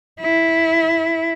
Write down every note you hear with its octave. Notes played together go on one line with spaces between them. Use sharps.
E4